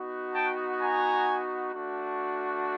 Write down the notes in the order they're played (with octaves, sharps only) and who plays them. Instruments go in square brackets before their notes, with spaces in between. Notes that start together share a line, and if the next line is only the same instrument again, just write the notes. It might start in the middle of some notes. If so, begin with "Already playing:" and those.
Already playing: [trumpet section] B3 D#4 F#4
G5 A5
G#5 A#5
A3 D4 F#4